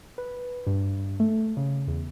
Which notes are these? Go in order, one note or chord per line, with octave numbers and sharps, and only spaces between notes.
B4
G2
A3
C#3
E2